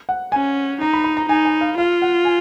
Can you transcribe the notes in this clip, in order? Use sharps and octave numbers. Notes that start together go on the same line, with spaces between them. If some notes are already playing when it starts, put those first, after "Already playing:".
F#5
C#4 G#5
D#4 A#5
B5
B5
A#5
D#4 G#5
G#5
F5
F4 F5
F#5
G#5